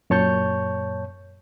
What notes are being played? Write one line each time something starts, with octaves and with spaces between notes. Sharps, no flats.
F#2 A#2 C#5 A5 C#6 G6